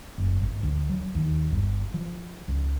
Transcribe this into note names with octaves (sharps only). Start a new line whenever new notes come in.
F#1
G#1
D2
F#3
D#2
G1
F3
C#2